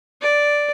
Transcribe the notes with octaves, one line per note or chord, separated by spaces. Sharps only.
D5